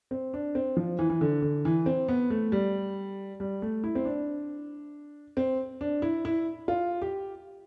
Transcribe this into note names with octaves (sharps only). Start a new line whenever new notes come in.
C4
D4
C4
F3
E3
E3
D3
D3
E3
C4
B3
A3
G3
G3
A3
E4
C4
D4
C4
D4
E4
E4
F4
G4